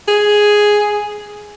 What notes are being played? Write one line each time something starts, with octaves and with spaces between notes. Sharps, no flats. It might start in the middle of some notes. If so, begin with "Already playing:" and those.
G#4